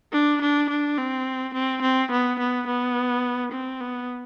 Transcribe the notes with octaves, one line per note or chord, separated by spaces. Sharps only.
D4
D4
D4
C4
C4
C4
B3
B3
B3
C4
B3